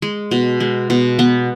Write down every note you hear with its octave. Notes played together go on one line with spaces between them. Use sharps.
G#3
B2
G#3
B2
B3